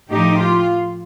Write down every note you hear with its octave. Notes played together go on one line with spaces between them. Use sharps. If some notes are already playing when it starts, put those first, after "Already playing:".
A2 F3 D#4 G4
F4